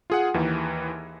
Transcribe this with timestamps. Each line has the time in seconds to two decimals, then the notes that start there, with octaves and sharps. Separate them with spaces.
0.10 F4 G#4 F#5
0.34 D#2 E3 D#4